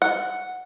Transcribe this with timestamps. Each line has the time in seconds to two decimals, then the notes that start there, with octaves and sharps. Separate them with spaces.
0.02 F#5